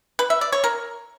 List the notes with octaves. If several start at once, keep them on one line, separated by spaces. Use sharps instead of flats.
B4
E5
D5
C#5
A#4